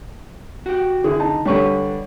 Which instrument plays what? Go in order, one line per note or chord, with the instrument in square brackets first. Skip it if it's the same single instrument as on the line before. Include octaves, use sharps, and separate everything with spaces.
[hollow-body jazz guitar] F#4 G4
[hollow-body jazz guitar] D3 [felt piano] E4 G#4
[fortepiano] D#4 [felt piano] A5
[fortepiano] D3 G3 [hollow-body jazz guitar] D4 B4 [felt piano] C#5 C#6